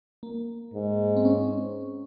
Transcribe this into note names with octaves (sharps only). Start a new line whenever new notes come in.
A#3
G#2
C4
C#4